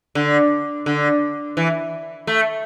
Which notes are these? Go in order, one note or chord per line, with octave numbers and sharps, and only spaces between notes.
D3
D3
E3
A3